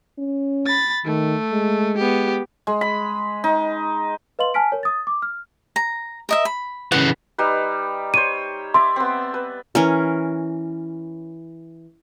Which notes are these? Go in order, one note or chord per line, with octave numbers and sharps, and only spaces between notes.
C#4
B5 A6
D#3 A3
G#3
B3 G4
G#3
B5
D#4
B4 D#5 F5 C6 F#7
G#5 A5 F6 B6 D7
A#4 C#5
D#6 A6
D6
F6
A#5
A#4 D#5 E5
B5
C#3 E3 F#5
G3 D#4 B4
C5 C#5 D#7
D5 E5 C6
B3 C4
B4
E3 C#4 A#4